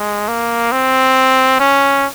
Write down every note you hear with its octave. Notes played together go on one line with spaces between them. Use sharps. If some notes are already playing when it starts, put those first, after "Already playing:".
Already playing: G#3
A#3
C4
C#4